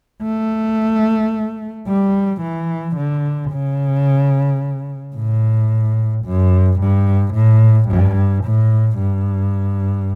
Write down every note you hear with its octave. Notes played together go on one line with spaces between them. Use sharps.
A3
G3
E3
D3
C#3
A2
F#2
G2
A2
G2
A2
G2